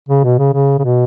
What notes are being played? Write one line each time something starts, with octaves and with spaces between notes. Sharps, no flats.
C#3
B2
C#3
C#3
C#3
B2